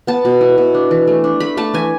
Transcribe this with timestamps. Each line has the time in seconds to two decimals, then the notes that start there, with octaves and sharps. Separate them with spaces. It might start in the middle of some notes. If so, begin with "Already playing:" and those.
0.07 B3 A5
0.25 B2
0.41 E4
0.58 B2
0.74 D4
0.91 E3
1.07 A3
1.24 D4
1.40 A3 B5
1.57 A3 A5
1.74 E3 G#5